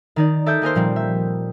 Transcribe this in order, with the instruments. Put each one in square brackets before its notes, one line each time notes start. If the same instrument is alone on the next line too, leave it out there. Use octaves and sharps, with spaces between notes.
[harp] D#3 D#4 D5
A4 D5 E5 D6 D#6 G6
A#3 G#4 A#4 C5
A#2 F3 G3 C4
E5